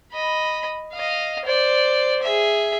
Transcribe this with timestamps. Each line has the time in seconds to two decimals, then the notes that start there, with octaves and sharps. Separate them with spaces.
0.13 D#5 B5
0.93 D#5 F5
1.46 C5 D5
2.23 G#4 E5